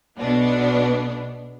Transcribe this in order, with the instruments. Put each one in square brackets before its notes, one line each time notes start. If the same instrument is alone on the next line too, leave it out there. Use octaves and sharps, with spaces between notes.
[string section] B1 B2 B3 D4